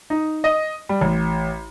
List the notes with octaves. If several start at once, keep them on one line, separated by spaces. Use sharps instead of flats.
D#4
D#5
G3
A1